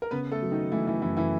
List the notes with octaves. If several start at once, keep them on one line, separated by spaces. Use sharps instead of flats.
A#4
C#3 B3 B4
A3 A4
F#3
D#3 D#4
E3 A3 E4
E3 E4
F#2 E3 E4
E3 E4